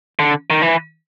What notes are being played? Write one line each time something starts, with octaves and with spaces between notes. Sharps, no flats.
D3
D#3
E3